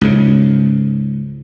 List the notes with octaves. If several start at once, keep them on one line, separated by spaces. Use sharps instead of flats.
C#2 G#2 C#3